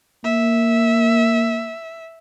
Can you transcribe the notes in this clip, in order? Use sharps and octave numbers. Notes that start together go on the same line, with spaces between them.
A#3 E5